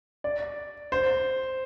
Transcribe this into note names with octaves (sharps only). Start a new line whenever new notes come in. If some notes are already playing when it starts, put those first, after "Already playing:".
D5
C5